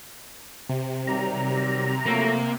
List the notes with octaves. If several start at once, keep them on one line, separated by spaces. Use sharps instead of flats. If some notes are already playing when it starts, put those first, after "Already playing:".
C3
D#3 F#3 G3 A#5
F3 F#3 A3 A#3